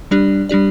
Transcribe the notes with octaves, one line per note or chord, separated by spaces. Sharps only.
G3 D4 G4 D5
G3 D4 G4 D5